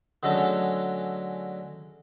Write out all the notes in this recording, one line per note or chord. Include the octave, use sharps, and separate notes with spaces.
D3 F#3 G#3 A3 C#4 A4